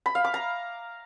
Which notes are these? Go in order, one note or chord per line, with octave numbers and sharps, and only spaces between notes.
B5
F5
D6
A#5